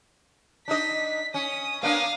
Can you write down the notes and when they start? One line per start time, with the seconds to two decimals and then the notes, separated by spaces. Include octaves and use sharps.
0.68 D4 D#4 D#5 B6
1.34 C#4 D#6
1.83 A#3 B3 D4 F5 D#6